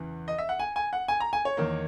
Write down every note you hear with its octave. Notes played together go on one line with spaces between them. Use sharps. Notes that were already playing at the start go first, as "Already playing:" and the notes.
Already playing: E2 C#3 E3
D#5
E5
F#5
G#5
G#5
F#5
G#5
A#5
G#5
C#5
E2 D#3 A#3